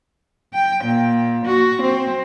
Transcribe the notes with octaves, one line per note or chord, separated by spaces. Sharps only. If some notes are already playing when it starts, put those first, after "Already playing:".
G5
A#2
F#4
C4